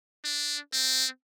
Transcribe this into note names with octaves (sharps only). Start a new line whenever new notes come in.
D4
C4